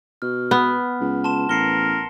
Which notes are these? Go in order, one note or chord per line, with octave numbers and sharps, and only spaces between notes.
B2 F6
B3
C#2
A5 C6 E7
A1 A#4 C7 C#7 G7